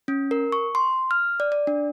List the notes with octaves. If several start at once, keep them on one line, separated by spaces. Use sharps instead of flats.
C#4
A#4
C#6
C6
F6
D5
D5
D4